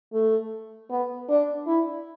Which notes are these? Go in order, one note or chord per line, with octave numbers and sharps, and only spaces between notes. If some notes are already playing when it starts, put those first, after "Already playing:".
A3
B3
D4
E4